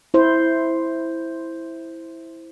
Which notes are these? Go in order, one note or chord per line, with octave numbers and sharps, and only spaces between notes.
E4 C5